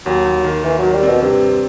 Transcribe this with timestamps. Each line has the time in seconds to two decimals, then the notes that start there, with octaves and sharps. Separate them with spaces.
0.06 D#2 F#3
0.25 D#2
0.44 D#3
0.64 D#3 E3
0.78 D#3 F#3
0.93 G3
1.03 B2 C4
1.22 G2 C3
1.42 C4